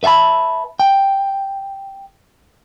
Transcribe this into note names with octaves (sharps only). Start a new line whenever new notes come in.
B4 E5 F5 A5 B5
G5